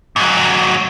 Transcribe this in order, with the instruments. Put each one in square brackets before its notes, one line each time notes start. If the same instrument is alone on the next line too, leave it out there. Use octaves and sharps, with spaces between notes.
[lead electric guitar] G#2 F#3